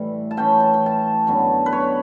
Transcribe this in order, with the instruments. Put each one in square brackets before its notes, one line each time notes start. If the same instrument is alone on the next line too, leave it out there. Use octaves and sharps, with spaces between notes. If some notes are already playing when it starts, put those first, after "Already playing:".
Already playing: [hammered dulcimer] A2 E3 G3
A5
E3 A3 C#4 G5
A5
G5
A5
F#2 D3 F#3 B3
B4
C#5